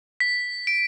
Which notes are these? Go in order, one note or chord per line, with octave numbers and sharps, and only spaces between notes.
B6
D7